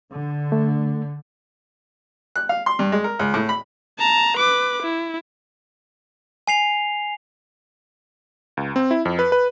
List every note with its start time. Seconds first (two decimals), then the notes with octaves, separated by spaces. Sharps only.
0.13 D3
0.52 A3
2.36 F#6
2.49 F5
2.66 C6
2.79 G2
2.92 G#3
3.04 A#4
3.19 C#2
3.34 A2
3.49 B5
3.99 A5 A#5
4.37 B4 D6
4.83 E4
6.48 G#5 C7 F7
8.57 C#2
8.76 C4
8.91 E4
9.05 F2
9.19 B4
9.32 B4